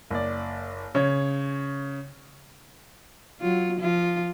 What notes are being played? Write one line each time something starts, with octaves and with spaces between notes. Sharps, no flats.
F#1 D5
C#3 C#5
F#3 F4
F3 F4